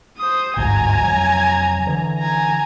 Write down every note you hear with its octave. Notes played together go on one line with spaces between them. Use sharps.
C5 D#6
G1 D2 G#2 G#5 A#5
F1 F#3
D3 E3
G#5 A#5